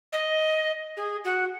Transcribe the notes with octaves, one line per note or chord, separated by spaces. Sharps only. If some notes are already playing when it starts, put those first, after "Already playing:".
D#5
G#4
F#4